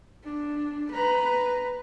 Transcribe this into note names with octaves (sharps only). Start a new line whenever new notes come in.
D4
B4 A#5